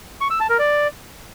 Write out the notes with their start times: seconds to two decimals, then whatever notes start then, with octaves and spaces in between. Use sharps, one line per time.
0.21 C#6
0.30 E6
0.40 A5
0.49 A#4
0.59 D5